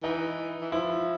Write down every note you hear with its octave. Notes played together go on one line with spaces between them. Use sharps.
E3 D#4
E3
F3 E4